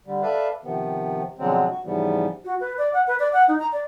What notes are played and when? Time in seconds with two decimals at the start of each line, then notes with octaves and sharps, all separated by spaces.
0.06 D3 G3
0.22 A4 B4 D5 E5 F5
0.64 C3 D#3 F3 B3
1.39 B2 D3 F3 F#3 G#3 C4
1.71 F#4
1.84 G#2 C#3 E3 F3 G3 B3
2.45 F#4
2.61 B4
2.78 D5
2.93 F#5
3.07 B4
3.20 D5
3.33 F#5
3.48 D#4
3.59 A#5
3.72 D5